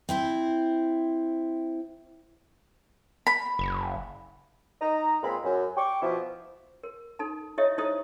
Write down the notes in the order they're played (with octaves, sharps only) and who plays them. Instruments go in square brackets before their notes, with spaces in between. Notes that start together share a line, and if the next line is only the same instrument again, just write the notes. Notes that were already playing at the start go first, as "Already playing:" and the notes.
[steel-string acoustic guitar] C4 E4 C5
[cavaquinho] B5
[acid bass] F#1
[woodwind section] D#4 D#5 A#5
C#2 A#2 G#3 C4 B5
F#2
G5 C#6 D6
B2 F3 E4
[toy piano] A#4
D#4 A4 A5
E4 G4 A4 C#5 D#5 E5
D#4 E4 G4 A4 C5 D#6